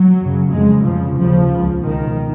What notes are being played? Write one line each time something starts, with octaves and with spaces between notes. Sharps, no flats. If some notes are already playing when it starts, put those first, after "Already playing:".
Already playing: F#3
F#2 C#3
F2 C#3 G#3
F2 C#3 F3
D#2 C#3 F3
C#2 C#3
C#2 B2 D#3